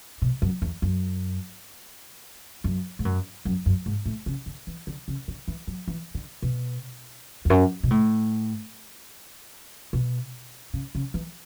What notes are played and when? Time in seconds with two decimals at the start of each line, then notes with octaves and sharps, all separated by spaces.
0.22 B2
0.42 F#2
0.62 E2
0.82 F#2
2.64 F#2
2.99 G#2
3.05 F#2
3.45 F#2
3.66 F#2
3.86 G#2
4.06 A2
4.26 C#3
4.46 D3
4.67 E3
4.87 D3
5.08 C#3
5.28 D3
5.48 E3
5.67 F#3
5.88 E3
6.15 D3
6.42 B2
7.45 E2
7.50 F#2
7.83 B2
7.91 A2
9.93 B2
10.74 C#3
10.95 C#3
11.14 E3